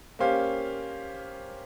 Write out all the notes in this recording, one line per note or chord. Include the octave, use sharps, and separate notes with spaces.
A#3 C#4 G4 C5 F5